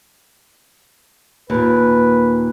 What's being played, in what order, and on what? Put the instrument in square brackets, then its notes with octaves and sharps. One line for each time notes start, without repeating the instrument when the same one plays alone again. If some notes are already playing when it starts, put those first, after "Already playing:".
[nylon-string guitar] D#2 A#2 [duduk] B4